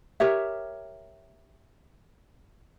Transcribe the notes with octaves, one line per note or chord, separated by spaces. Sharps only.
G4 A#4 C#5 E5